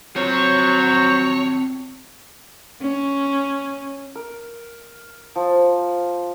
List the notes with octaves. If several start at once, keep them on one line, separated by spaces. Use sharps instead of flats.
F#3 C4 F4 F#4 C5 C#5
C#4
A#4
F3